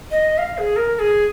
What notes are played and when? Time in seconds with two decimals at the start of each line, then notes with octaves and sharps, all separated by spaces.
0.11 D#5
0.38 F5
0.58 G#4
0.76 A#4
0.95 A#4
0.99 G#4